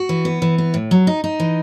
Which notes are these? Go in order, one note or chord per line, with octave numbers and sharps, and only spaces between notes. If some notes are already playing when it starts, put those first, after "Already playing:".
Already playing: F#4
E3
B3
E3
B3
A2
F#3
D#4
D#4
E3